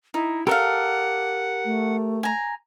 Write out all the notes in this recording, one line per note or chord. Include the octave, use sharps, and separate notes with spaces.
D#4 E4
G4 A4 A#4 D5 F5 F#5
A3
G#5 A#5